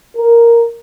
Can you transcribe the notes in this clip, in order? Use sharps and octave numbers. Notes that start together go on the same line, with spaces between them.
A#4